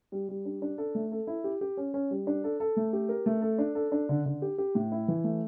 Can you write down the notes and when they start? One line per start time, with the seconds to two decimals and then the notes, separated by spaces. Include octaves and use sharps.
0.12 G3
0.29 G3
0.45 D4
0.62 D4
0.78 A4
0.95 A3
1.12 A4
1.27 E4
1.44 G4
1.61 G4
1.77 C#4
1.94 C#4
2.11 G3
2.27 D4
2.44 A4
2.60 A4
2.77 A3
2.93 G4
3.09 A#4
3.26 A3
3.42 A4
3.58 D4
3.75 A4
3.92 D4
4.09 D3
4.26 D3
4.42 G4
4.58 G4
4.75 A2
4.92 E4
5.08 E3
5.24 A3